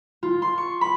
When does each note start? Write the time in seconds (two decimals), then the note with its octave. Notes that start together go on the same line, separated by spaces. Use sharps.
0.23 F4
0.42 C6
0.58 C#6
0.81 B5